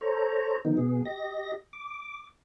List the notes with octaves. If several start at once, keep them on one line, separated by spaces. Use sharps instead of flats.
A4 C5 C#5 A#5
D3 D#3 F3 B3 D#4
B2 B3 G#4
G4 D#5 A#6
D6